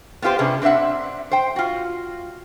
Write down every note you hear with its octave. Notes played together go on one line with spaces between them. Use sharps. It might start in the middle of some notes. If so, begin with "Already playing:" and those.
B3 C4 F4 G4 C5
C3 C#4 D4 G#4 B4
C4 D4 C5 E5 F#5
C5 G5
F4 F#4